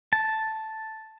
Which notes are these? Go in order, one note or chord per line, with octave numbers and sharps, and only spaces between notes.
A5